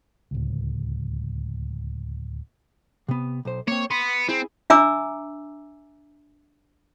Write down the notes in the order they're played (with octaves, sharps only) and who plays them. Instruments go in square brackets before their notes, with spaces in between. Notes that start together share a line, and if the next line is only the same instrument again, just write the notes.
[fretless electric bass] D1 C#2
[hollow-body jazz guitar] C3 B3
B1 C5
[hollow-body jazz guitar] A#3 C4 [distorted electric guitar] C#5
[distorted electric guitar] B3 [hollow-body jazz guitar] B5 C6
[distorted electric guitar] C4 [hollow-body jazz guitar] E4 G#4
[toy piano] D4 E5 G#5 A#5 D6 E6